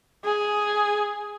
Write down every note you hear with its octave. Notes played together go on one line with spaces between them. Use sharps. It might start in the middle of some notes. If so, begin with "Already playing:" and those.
G#4